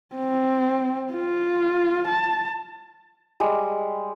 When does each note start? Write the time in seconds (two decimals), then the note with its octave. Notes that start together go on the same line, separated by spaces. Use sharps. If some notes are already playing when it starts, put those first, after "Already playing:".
0.15 C4
1.13 F4
2.08 A5
3.40 G3 G#3